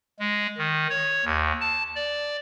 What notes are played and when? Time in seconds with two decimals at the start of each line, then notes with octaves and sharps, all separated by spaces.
0.19 G#3
0.58 D#3
0.90 C#5
1.25 D#2
1.61 A5
1.96 D5